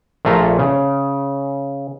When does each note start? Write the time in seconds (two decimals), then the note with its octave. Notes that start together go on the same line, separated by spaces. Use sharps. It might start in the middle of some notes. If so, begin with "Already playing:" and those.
0.25 A#1 A#2 A3 F4 A#5
0.59 C#3